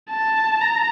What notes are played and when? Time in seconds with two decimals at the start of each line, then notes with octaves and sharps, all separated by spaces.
0.11 A5
0.61 A#5